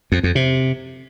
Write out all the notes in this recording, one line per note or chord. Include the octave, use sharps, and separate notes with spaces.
F2
F2
C3